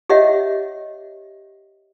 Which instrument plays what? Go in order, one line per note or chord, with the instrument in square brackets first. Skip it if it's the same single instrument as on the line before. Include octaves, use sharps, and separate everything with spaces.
[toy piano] G4 C#5 D#5 E5 F#5